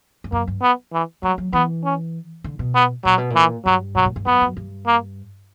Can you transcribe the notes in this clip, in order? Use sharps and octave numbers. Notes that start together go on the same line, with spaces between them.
G2
F#2 A#3
G2
B3
E3
F#3 G3
F#3
E3 B3
C#4
D3
B2
B3
A#2 F#3
B2
A#2
E3
G2 F#3
B2 F#3
A#2
G2
F#2 B3
F#2
G2
A#3